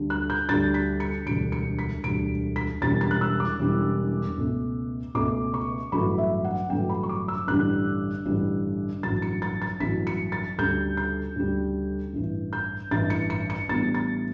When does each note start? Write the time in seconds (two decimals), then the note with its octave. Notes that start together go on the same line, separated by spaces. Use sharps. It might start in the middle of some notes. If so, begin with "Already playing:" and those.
Already playing: D2 D3 G3 D4
0.10 F#6
0.30 G6
0.49 D2 D3 G3 D4 A6
0.74 B6
1.00 C#7
1.26 E1 D2 D3 G3 D7
1.52 C#7
1.79 B6
2.04 E1 D2 D3 G3 D7
2.56 B6
2.82 E1 E2 D3 G3 C#4 A6
3.01 A6
3.11 F#6
3.21 E6
3.40 D6
3.59 E1 E2 D3 G3 C#4
4.37 C#2 B2 A3 C#4
5.15 C#2 B2 A3 C#4 D6
5.54 C#6
5.92 A1 G2 D3 F#3 A3 B5
6.18 E5
6.44 F#5
6.70 A1 G2 D3 F#3 A3 G5
6.89 B5
7.03 C#6
7.09 D6
7.28 E6
7.47 A1 G2 D3 G3 D4 F#6
8.25 A1 G2 D3 G3 D4
9.03 A1 G2 D3 F#3 A6
9.22 C#7
9.42 A6
9.62 A6
9.80 A1 G2 D3 F#3 B6
10.07 C#7
10.32 A6
10.58 D2 C#3 G3 G6
10.97 G6
11.36 D2 C#3 G3
12.14 A1 G2 E3
12.53 G6
12.91 A1 G2 E3 A6
13.10 C#7
13.30 C#7
13.50 C#7
13.69 A1 A2 G3 B3 D4 A6
13.95 A6